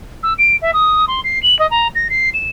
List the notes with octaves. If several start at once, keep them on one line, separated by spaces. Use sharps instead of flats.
E6
D7
E5
D#6
C6
C7
F#7
D#5
A#5
A#6
C7
E7